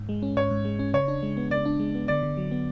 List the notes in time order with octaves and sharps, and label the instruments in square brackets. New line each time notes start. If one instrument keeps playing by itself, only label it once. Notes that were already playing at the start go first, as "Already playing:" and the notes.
Already playing: [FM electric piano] G#2
G#3
C#4
[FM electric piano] G#2 [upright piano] C#5
[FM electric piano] G#2
G#3
C#4
[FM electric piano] C#3 [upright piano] C#5
[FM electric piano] D4
G#3
B3
[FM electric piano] C#3 [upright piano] D5
[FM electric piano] D4
G#3
B3
[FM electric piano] D3 [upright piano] D5
[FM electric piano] D3
F#3
B3